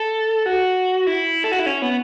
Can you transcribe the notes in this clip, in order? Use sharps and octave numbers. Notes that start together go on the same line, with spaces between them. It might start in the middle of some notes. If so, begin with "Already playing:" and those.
Already playing: A4
F#4
E4
A4
F#4
E4
C#4
B3